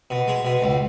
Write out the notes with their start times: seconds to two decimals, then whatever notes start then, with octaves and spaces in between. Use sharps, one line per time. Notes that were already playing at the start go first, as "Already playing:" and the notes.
0.10 B2
0.28 G#3
0.45 B2
0.62 C#2